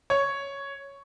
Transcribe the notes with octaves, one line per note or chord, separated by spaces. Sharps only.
C#5